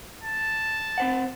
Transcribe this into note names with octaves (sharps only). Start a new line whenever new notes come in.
A5
C4 C5 F#5